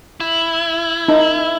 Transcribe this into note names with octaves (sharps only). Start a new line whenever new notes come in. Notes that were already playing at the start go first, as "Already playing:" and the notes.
E4
D#4